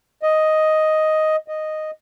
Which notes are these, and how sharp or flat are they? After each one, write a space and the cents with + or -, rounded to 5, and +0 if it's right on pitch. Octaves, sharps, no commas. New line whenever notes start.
D#5 +5
D#5 -5